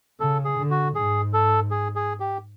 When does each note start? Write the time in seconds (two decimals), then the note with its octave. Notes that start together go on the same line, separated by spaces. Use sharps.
0.20 C#3 A4
0.45 G#4
0.58 D3
0.71 F#4
0.95 G#2 G#4
1.33 A4
1.71 G#4
1.96 G#4
2.20 G4